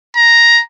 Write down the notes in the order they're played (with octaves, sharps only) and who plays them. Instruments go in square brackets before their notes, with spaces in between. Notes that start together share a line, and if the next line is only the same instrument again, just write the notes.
[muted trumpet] A#5